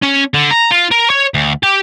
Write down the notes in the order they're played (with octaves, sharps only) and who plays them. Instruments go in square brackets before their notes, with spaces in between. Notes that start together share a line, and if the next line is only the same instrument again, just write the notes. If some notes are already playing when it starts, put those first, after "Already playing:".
[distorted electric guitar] C#4
D3
A#5
F4
A#4
C#5
D2
G4